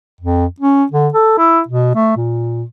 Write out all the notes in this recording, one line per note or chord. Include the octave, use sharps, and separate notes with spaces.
F2
C#4
D3
A4
E4
B2
A3
A#2